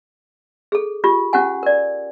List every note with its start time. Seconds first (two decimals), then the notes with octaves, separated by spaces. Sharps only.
0.72 G#4 A4
1.04 F4 G4
1.33 C#4 F4 G4 F#5 G#5
1.63 A#4 D5